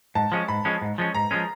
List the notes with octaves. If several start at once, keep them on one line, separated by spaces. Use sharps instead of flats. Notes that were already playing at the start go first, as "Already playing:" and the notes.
G#2 A5
F3 G#3 C#4
G#2 B5
F3 G#3 C#4
G#2
F3 G#3 C#4
G#2 A#5
F3 G#3 C#4